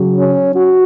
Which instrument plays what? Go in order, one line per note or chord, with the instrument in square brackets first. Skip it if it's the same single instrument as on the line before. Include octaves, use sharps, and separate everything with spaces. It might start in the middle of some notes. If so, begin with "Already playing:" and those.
Already playing: [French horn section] C#3 F#3
C#4
F#4